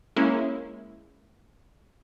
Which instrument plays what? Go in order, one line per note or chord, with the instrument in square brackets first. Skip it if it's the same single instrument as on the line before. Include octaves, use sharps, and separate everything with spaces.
[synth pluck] G#3 A#3 C#4 E4